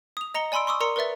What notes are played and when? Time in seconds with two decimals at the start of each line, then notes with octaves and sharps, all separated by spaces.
0.17 D#6 F7
0.34 D#5 A#5 C#7 G7
0.52 D5 G#5 B5 C6 E6 D7
0.67 C6 C#6 D#6 E6
0.80 A#4 D5 A#5 C6 C#7
0.96 A#4 B4 D5 E5 A6